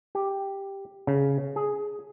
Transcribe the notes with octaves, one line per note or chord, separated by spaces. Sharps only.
G4
C#3
G#4